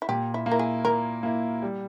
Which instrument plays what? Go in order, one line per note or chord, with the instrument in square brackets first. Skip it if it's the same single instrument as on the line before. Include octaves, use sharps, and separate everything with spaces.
[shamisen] E4
[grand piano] A#2 [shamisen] G4
[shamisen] E4
[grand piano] A#3
[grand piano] E4 [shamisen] A#4
[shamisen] G#4
[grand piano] A#2 [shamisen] A#4
[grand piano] A#3 E4
G3